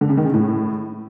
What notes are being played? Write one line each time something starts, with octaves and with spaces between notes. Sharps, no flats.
D3
C#3
D#3
C#3
A2